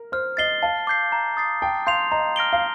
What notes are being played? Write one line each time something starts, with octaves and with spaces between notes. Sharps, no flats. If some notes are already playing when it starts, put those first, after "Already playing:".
Already playing: A#4
C5 F6
D#5 A6 C7 G7
F5 A5
D6 G6 C7
A#5
D#6 A6 C7
G5 A5
F5 C6 G6 C7 F7
D#5 A#5
F6 A#6 D7 G7
F5